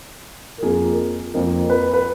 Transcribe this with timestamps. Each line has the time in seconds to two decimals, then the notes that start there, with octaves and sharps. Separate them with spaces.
0.58 A#4
0.62 F2 F3 A#3 G#4
1.34 F2 F3 A#3 A#4
1.70 B4
1.94 B4